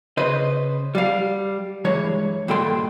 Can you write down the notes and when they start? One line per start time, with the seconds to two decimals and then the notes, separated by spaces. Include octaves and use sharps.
0.17 C#3 B4 C5 D#5
0.95 G3 F5
1.85 G2 E3 G#3 C#5
2.48 G2 A#2 D#3 A4 G5 C6